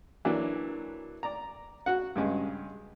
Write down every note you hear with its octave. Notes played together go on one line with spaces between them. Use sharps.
E3 F#3 A#3 D4
D5 A#5
F#4 F#5
G2 C#3 G#3